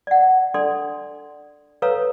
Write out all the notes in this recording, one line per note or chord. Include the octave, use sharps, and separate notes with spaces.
D5 F#5
D4 A4 D5 C6
A4 B4 C#5 F5 A#5 E6